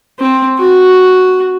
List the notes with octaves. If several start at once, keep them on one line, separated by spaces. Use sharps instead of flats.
C4
F#4